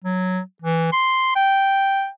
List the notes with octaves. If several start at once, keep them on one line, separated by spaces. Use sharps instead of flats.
F#3
E3
C6
G5